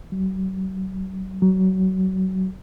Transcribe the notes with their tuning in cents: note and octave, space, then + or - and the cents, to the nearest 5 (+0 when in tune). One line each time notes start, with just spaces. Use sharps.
F#3 +40
F#3 +25